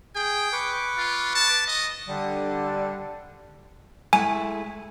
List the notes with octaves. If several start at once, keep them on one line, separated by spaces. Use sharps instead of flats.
G#4 G5
B4 C#6 D6
F4
A5
D#5
D3 G3
G#3 A3 E4 G#5